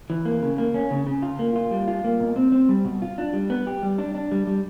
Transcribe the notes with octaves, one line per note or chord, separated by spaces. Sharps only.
E3
A#3
C#3
A#3
C#4
C#3
C#3
F4
A#3
F4
G3
F4
A#3
B2
C4
C4
G3
B2
F4
D4
G3
B3
G4
G3
D4
D4
G3
G3